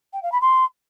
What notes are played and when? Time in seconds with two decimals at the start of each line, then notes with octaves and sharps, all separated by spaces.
0.13 G5
0.23 F5
0.32 B5
0.42 C6